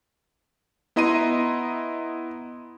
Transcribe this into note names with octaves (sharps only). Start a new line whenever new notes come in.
B3 E4 D#5 A#5 C6 D#7